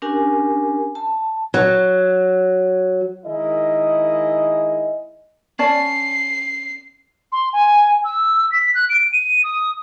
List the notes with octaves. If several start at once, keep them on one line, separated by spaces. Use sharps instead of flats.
C#4 D4 G4 A#4 G#5
A5
F#3
D#3 G#3 E4 G#4 A#4 D#5
C#4 D5 A5 C7
C6
G#5
E6
B6
F#6
D7
D#7
D#6